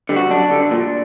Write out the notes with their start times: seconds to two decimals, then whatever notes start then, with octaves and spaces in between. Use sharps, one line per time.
0.09 D3 G3
0.16 F#4
0.31 F#2 D4
0.51 D3 G3
0.71 A#2